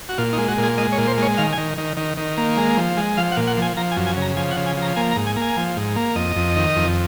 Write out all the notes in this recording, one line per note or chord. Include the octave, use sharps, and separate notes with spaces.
F#4
A#2 F4
D#4
G#3
F#4
A#2
G#4
G#3 D#5
C#5
A#2
C5
G#3
C#5
D#3 F5
G#5
D#3
D#3
D#3
D#3
A#3
G#3
F3
G#3
F3 F5
F#5
A#2
F#5
F3 G#5
F3 A#5
G#5
F#2
G#5
C#3 A#5
F3 G#5
F#5
C#3
G#5
F3 A#5
A#3 G#5
A#5
G#2
G#5
A#3
G#5
F3
G#2
A#3
F2 D#5
F2
D#3
F2